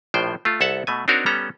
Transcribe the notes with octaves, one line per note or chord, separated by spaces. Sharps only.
A#1 A2 F3 C5 G5
A3 F4
C2 A4 E5 F#5 A5
B2 A3 G#5
C4 D4 D#4 F#4 A#4 C#5
G3 B3 C#4 A4 A#5